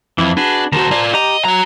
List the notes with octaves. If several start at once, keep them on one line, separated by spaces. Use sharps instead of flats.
F2 E3 E4
D4 F#4 G#4 B4
D#2 F#4 C5 A5 A#5
F4 D5
G4 D#5 A#5
F#3 F#4 A#5